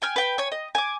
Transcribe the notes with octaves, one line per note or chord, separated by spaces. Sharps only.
G5 G#5 F6
B4 G5
C#5 G#5
D#5
G#5 D6